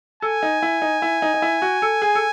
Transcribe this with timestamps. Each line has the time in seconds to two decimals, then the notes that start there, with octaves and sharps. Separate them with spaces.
0.22 A4 G#5
0.43 D#4
0.62 E4
0.82 D#4
1.02 E4
1.22 D#4
1.34 D#4
1.42 E4
1.62 F#4
1.82 A4
2.02 G#4
2.15 A4